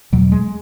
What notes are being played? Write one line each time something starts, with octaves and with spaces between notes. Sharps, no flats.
E2 B2 F#3
G#3